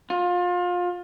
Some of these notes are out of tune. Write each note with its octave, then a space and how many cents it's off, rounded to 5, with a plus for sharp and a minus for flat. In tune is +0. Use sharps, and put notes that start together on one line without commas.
F4 +25